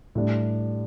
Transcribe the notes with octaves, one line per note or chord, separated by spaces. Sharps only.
A2 G3 D4